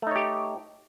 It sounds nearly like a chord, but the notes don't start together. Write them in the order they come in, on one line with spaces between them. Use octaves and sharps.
A3 D#4 C#5 G4